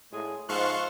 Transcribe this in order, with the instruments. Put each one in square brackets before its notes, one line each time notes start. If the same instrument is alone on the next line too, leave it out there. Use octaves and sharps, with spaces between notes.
[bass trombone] A2 [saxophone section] G#3 G#4
[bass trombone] G#2 [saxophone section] F3 G#3 A4 [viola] C5 [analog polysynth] F5 C#6 F#6